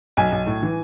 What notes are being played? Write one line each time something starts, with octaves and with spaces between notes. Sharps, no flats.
B1 G#5
B1
A2
E3